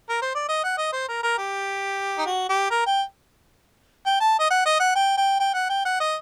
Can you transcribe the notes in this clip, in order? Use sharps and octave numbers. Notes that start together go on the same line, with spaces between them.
A#4
C5
D5
D#5
F#5
D#5
C5
A#4
A#4
G4
D#4
F#4
G4
A#4
G5
G5
A5
D#5
F#5
D#5
F#5
G5
G5
G5
F#5
G5
F#5
D#5